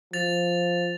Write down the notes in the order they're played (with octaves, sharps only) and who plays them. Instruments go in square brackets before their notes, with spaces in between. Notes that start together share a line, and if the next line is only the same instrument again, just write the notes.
[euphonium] F3 [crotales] A6 F7